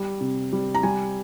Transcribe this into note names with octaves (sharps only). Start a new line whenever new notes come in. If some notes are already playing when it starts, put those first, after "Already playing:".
Already playing: G3
C3
G3
A#5
G3 G#5